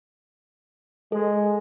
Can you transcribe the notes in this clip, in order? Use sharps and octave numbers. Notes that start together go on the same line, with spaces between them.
G#3 A4